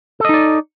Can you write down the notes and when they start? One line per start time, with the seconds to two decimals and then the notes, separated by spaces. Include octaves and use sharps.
0.20 A4
0.25 D#5
0.29 D#4
0.34 D5